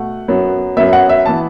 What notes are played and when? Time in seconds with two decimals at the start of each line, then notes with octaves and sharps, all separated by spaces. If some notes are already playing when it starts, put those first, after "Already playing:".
Already playing: B2 A3 F#5
0.28 F#2 F#3 B3
0.77 F#2 F#3 B3 E5
0.93 F#5
1.09 E5
1.26 E3 B3 A5